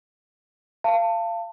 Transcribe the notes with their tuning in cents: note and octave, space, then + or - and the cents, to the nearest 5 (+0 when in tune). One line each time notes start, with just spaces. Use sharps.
F5 -25 A5 +20